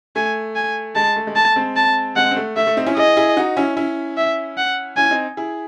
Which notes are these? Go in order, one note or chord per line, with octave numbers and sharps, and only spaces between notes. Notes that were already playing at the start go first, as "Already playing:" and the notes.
A3 G#5
G#5
G#3 A5
A3
G#3
A3 A5
G#3 C4
A5
G#3 C4 F#5
C4
A3
A3 E5
A3
C4 D#4
C#4 E4
E4 G#4 D#5
E4 G#4
D#4 F#4
C#4 E4
C#4 E4
E5
F#5
C#4 E4 G#5
C4 D#4
E4 G#4